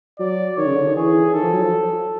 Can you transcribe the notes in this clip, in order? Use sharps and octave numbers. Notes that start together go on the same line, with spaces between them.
F#3 D5
D#3 C#5
C#3
D3
D#3
E3 G#4
D#3 A4
F3
F#3
F3